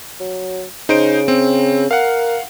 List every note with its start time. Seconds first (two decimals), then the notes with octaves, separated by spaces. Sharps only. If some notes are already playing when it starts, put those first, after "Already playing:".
0.20 F#3
0.89 C#3 D#4 C5 D7
1.28 C4
1.91 A#4 F5 F#5